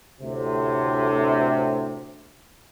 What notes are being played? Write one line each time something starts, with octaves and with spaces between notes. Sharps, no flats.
D2 A2 C3